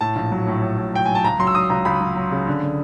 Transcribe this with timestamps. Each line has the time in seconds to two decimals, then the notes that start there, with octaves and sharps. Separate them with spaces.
0.01 A2 A5
0.16 A#1
0.31 F#3
0.47 A2
0.62 A2
0.78 A2
0.93 F#3 G5
1.05 F#3 G#5
1.15 A5
1.24 C#2 A#5
1.39 F#3 C6
1.47 E6
1.55 F#3 D#6
1.70 C#2 A#5
1.85 C#2 B5
2.01 F#3
2.16 F#3
2.32 C#3
2.47 D3
2.63 D3